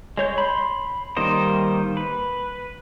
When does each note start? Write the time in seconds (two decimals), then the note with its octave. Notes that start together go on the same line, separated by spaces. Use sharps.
0.17 G#3 C#5 G6
0.38 B5 C6
1.17 D#3 G3 A#3 C5 D#5
1.97 B4